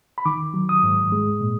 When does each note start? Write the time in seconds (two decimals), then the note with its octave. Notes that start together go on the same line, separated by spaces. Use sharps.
0.18 B5
0.26 D#3 D6
0.54 F#3
0.69 D#6
0.83 G#2
1.12 G#3
1.41 A#2